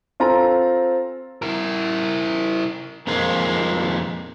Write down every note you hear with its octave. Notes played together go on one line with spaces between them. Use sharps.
C4 F4 A4 G#5 A#5
E4 A#4
F2 A#2 D#3 G#3 F4